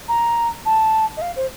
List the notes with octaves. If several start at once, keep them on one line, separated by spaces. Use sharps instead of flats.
A#5
A5
D#5
F5
C5